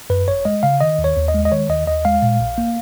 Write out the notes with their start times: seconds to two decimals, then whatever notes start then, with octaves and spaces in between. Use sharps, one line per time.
0.10 F#2 B4
0.27 G#1 C#5
0.45 G#3 D#5
0.63 C#3 F5
0.81 D#3 D#5
0.98 D#2
1.04 C#5
1.16 D#2
1.28 D#5
1.34 G#3
1.45 D#5
1.52 D#3 C#5
1.69 D#2 D#5
1.87 D#2 D#5
2.05 G#3 F5
2.22 A#2
2.41 A#1
2.58 A#3